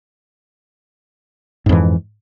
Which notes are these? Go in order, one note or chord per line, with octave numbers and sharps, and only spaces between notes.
F2 G#2 E3